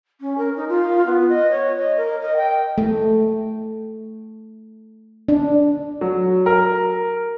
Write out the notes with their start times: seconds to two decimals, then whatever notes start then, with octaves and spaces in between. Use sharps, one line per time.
0.20 C#4
0.37 A#4
0.56 D#4
0.68 F4
1.06 B3
1.28 D#5
1.50 C#5
1.77 D#5
1.96 A#4
2.21 D#5
2.36 G5
2.78 A3
5.28 D4
6.01 F#3
6.46 A#4